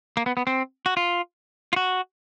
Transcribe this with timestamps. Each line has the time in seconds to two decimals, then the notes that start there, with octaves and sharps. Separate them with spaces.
0.17 A#3
0.26 B3
0.37 B3
0.47 C4
0.86 F#4
0.97 F4
1.73 F4
1.76 F#4